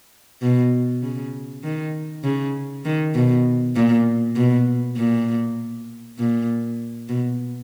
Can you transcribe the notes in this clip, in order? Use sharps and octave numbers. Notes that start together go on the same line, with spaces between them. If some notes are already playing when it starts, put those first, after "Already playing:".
B2
C#3
D#3
C#3
D#3
B2
A#2
B2
A#2
A#2
B2